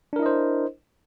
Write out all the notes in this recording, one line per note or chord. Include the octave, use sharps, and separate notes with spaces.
D4 E4 A#4 C5 D#5